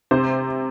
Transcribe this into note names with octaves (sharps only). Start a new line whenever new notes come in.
C3 C5